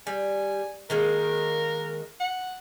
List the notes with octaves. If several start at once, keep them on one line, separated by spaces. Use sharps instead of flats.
G3 G#5
D#3 G#3 A#3 A#4
F#5